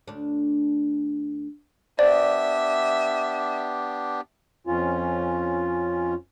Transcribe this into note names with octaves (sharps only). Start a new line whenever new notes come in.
D2 D4
B3 D4 G4 C5 D5 E5
F2 C#4 F4